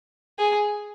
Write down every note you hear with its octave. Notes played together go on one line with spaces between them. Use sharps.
G#4